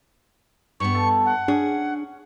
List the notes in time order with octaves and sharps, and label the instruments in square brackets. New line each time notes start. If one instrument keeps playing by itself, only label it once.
[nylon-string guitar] G2 B3 [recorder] C#6
[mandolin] A3 A5
[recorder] F#5
[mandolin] C#4 [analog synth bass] D4 [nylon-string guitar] G#4